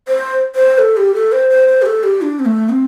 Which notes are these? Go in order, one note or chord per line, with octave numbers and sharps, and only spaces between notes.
C5
C5
A4
G4
A4
C5
C5
C5
G4
A4
G4
D4
C4
A3
C4